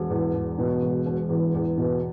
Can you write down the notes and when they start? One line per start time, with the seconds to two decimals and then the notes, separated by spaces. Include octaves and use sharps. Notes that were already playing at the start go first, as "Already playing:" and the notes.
Already playing: E1
0.10 E2
0.34 E1
0.59 B2
0.82 E1
1.06 E1
1.29 E2
1.54 E2
1.78 B2